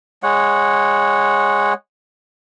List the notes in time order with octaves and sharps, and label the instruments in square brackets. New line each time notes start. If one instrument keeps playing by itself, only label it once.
[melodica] G#3 C#5 F#5